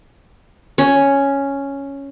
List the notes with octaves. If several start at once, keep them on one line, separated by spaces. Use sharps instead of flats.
C#4